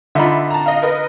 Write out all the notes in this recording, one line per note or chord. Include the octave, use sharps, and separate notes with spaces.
D3 D#4 F4 E5 B5
A5 A#5
D#5 F5
A#4 B4 D#5